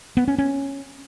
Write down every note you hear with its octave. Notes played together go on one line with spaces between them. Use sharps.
B3
C#4
C#4